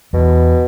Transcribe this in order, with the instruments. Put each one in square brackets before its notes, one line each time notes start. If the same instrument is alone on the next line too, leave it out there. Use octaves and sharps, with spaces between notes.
[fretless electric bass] E2 [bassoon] B2